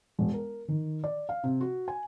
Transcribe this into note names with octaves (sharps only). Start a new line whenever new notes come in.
E1
A#4
D#3
D5
F5
C3
F#4
G#5